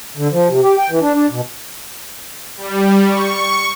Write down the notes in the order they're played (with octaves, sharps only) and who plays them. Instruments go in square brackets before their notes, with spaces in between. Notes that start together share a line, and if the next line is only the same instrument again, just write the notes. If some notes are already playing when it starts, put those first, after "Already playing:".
[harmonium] D3
F3
C3
G4
G5
E3
D4
D4
B2
[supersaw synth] G3
C#6